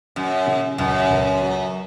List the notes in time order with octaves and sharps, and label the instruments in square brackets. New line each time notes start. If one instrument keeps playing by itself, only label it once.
[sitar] F#2 [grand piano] F#3
[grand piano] C#3
[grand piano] C#2 [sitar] F#2
[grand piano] C#2
F#3